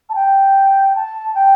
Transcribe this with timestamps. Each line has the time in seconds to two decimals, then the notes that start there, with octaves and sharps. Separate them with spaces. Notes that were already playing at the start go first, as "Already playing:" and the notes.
0.09 A5
0.15 G5
0.95 A5
1.35 G5